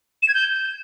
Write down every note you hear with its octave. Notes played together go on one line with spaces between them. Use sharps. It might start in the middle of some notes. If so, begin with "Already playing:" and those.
E7
G#6
G6